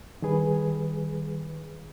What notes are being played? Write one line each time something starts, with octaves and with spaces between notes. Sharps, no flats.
D#3 G3 G#4 B4